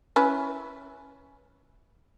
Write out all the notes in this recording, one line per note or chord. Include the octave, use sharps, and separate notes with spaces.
C#4 E4 B4